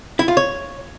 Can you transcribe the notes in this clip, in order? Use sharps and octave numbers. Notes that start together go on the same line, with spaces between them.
E4
F4
C#5